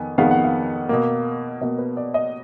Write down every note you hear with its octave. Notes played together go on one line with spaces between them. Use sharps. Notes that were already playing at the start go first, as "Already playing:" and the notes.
Already playing: F2 D#3 B3 G#5
F2 D#3 G#3 B3 F5
F#5
F5
B2 A#3
B2 A#3 D#5
B4
D5
D#5